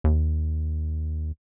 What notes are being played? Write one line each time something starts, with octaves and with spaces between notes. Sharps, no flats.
D#2